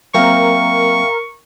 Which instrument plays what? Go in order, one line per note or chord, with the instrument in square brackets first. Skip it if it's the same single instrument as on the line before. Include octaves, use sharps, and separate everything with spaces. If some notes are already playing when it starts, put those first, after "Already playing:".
[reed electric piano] F#3 A#3 C4 [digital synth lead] A#4 [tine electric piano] E5 F5 G5 [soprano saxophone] C#6